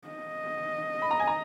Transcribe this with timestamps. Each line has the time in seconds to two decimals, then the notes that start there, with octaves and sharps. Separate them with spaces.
0.08 D#5
1.02 B5
1.11 A#5
1.19 G#5
1.27 A#5